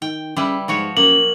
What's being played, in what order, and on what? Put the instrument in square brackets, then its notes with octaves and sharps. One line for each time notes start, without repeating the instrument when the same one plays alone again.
[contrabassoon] D#3 [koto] G5
[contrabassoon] C#3 [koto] G3 E4 B4
[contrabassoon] G#2 [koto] F3 F#4 C#5
[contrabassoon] F#2 [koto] A#3 [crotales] F#7